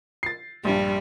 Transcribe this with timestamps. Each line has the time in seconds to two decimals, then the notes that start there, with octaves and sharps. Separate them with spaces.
0.23 A6 C7
0.65 A#1 G2 G3